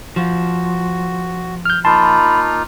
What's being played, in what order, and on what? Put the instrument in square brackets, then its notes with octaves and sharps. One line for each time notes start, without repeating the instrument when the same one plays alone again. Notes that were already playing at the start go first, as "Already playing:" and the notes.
[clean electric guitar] F3 [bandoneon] F#4
[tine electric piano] F6 G6
[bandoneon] A#3 D#4 F4 [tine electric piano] A5 C6 [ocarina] B5